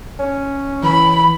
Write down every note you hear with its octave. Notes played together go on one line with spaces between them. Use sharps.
C#4
E3 B5